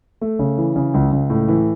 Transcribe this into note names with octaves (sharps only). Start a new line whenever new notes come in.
A3
C#3
E3
C#3
C#2
C#2
A2
E3